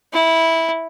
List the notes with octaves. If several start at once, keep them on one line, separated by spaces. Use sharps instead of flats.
E4